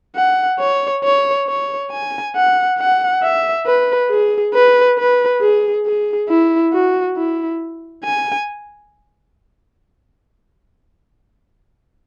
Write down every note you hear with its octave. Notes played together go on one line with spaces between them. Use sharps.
F#5
C#5
C#5
C#5
G#5
F#5
F#5
E5
B4
G#4
B4
B4
G#4
G#4
E4
F#4
E4
G#5